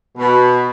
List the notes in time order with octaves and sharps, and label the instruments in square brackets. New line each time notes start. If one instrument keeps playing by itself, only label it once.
[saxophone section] B2